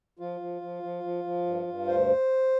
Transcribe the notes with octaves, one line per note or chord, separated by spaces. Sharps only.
F3 F4
F3
F3
F3
F3
F3
G2
G2
D2 C5